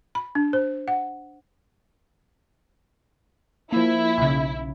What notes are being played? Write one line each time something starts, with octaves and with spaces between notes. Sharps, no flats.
B5
D4
C5
F#5
F3 A#3 E4
B1 C#3